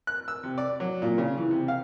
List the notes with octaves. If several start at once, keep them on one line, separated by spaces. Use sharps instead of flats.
F#6
E6
C3
D5
F#3
A#2
C#3
E3
C3
F5